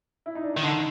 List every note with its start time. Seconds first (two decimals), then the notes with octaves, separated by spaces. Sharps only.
0.26 E4
0.35 D#4
0.44 D4
0.54 D#3 D#4
0.64 D3